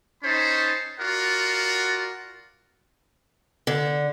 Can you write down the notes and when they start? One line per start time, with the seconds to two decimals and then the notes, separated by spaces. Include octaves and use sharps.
0.24 C#4 D#4 C5 A5 B5
1.00 F4 F#4 A#4 D5 F#5
3.67 D3